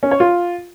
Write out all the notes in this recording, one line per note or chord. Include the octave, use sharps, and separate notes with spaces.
C#4
C#5
F4